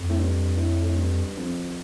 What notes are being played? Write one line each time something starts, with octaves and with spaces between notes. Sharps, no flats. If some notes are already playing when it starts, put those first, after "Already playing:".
Already playing: F2
A2
G2
A2
A2
G2
F2